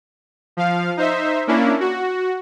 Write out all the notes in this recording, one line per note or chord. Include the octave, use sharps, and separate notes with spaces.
F3 F5
D#4 C5 E5
A#3 C#4 D4 E4
F#4